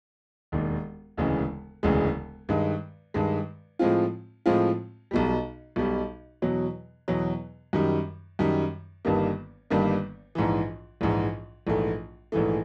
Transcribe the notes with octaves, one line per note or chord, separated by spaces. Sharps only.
E1 D#2 D#3
E1 D2 C#3 E3 G#3
E1 D2 C#3 E3 G#3
G2 D#3 G#3
G2 D#3 G#3
A2 F3 G#3 C4 F4
A2 F3 G#3 C4 F4
B1 B2 G3
B1 B2 G3
E2 B2 F#3
E2 B2 F#3
F#2 D#3 G3
F#2 D#3 G3
G1 G2 D#3 G3 A#3
G1 G2 D#3 G3 A#3
A#1 G#2 E3
A#1 G#2 E3
A#1 G#2 E3 A3
A#1 G#2 E3 A3